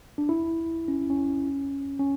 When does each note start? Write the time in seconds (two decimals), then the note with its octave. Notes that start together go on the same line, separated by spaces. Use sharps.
0.18 D4
0.29 E4
0.88 C#4
1.10 C#4
1.99 C#4